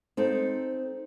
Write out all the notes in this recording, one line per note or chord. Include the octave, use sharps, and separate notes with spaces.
C4 D#4 A4